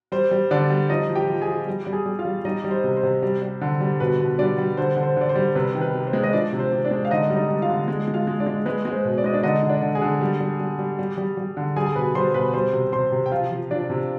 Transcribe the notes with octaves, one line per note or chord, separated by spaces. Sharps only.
G3 C5
G3
D3 D4 D5
G3
F3 D#4 D#5
F3
G4 G5
F3
G#4 G#5
F3
G3
G3
G#4 G#5
G3
F4 F5
G3
G3 D#4 D#5
G3
C5
C3
C5
C3
G3
G3
D3
G3
B2 B4
B2
G3 D4 D5
G3
D3 C5
D3
C5
D3 D5
C5
G3
C3 B4
D#3
B4
C3
C5
G#3
D#5
F3 D4 D5
C3
C5
C3
D4 D5
G#3
F5
D3 D#4 D#5
G3
D#4 D#5
G3
F4 F5
D3
G#3
G#3
F4 F5
G#3
D4 D5
G#3
G#3 B4
G#3
C5
B2
D5
G#3 D#5
D4 D5
D3 D#4 D#5
D3
D4 D5
D3
G#4 G#5
D3
G3
G3
G3
G3
G3
G3
G3
D3
G3 G#4 G#5
G#5
B2 B4 B5
G3 C5 C6
B2 B4 B5
G3 C5 C6
C3
C3 C5 C6
C3
G5
F3 F4 F5
F3
F3 D4 D5
C3